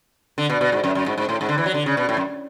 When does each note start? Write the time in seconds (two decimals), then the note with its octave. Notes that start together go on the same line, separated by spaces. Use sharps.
0.38 D3
0.49 B2
0.61 B2
0.72 G#2
0.84 F#2
0.95 F#2
1.06 G#2
1.17 G#2
1.29 A2
1.41 G#2
1.49 D3
1.58 E3
1.66 F#3
1.74 D3
1.86 C#3
1.97 B2
2.09 A2
2.17 F#2